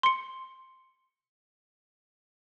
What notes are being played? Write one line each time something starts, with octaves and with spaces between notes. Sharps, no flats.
C6 C#7